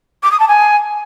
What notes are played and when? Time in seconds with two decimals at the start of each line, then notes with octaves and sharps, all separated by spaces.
0.23 D6
0.32 D#6
0.40 A5
0.48 G#5